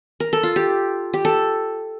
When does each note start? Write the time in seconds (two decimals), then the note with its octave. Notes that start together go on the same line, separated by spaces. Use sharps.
0.20 A#4
0.33 A4
0.43 F4
0.56 G4
1.14 G4
1.25 A4